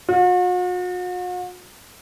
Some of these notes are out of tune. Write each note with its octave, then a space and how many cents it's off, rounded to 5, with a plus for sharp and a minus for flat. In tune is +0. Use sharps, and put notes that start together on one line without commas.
F#4 -45